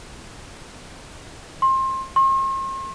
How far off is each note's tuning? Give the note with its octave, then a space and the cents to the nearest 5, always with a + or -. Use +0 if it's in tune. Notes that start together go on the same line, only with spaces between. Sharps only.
C6 +25
C6 +45